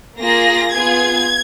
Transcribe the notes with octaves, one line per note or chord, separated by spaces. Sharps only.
A#3 F4 G#4 A#6
B3 F4 G#4 G#6